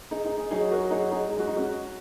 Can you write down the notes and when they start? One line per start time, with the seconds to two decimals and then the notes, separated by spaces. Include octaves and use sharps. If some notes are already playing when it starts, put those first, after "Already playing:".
0.11 D#4 G#4
0.24 D#4 G#4
0.38 D#4 G#4
0.51 F#3 D#4 G#4
0.71 F#4 A#4
0.91 D#4 G#4
1.11 D#4 G#4
1.31 G#3 G#4
1.39 F#4
1.48 D#4
1.56 C#4 F#4